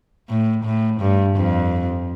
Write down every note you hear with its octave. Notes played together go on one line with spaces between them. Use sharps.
A2
A2
G2
F2